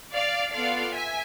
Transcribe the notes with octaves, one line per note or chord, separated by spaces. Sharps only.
D5 F5
B3 F4 A4 D5 F5
E5 G#5